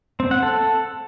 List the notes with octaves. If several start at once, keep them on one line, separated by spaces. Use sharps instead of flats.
C4
F#5
A4